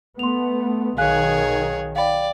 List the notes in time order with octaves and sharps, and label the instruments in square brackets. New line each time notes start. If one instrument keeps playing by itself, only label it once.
[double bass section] A3 B3 [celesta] C6 F7
[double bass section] B1 D#3 [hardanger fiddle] G#4 C#5 [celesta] F5 G#5 F#6
[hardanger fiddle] D5 [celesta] F5 G5 B5